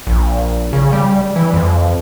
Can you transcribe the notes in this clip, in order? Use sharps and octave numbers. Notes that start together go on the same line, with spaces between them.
A#1
C#3
G3
E3
F2